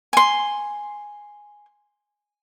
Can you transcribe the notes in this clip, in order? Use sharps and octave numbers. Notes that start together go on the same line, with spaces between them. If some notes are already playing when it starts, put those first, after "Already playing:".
G#5 C6